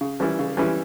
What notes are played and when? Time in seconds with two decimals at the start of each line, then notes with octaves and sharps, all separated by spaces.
0.01 C#3
0.20 E3 G3 C#4 E4
0.39 C#3
0.57 E3 G3 C#4 E4